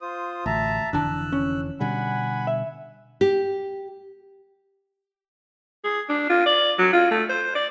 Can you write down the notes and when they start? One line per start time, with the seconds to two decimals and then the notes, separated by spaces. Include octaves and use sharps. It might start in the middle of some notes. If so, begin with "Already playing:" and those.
0.01 F4 C5 D#6
0.46 A1 D2 E5 A5 A#5
0.93 F1 D3 E3 D4 A5 E6 F#6
1.32 C#4
1.80 B2 D3 G3 F#5 G#5 B5
2.47 E5
3.21 G4
5.84 G#4
6.09 D4
6.30 F4
6.46 D5
6.79 F#3
6.93 F4
7.11 A3
7.29 C5
7.55 D5